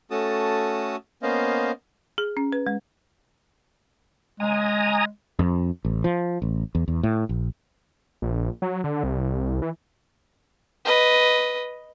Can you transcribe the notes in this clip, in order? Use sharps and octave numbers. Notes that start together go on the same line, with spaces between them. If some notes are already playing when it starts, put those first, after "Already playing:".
A3 C#4 F#4 A4 A5 D#6
A#3 B3 C#4 C5 D#5 F5
G#4
C#4
B4
G#3
G#3 G#5 A#5 D#6
F2
A1
F3
A1
E2
E2
A2
A#1
A#1
F#3
D3
C2
E3
B4 D#5